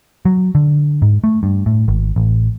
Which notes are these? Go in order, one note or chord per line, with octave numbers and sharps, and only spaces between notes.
F#3
D3
G#2
A3
G2
A2
G#1
A1